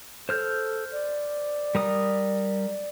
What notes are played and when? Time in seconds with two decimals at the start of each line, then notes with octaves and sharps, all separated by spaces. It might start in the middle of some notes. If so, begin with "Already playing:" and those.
0.29 A4 C5 F6 G6
0.92 D5
1.75 G3 A#4 D#6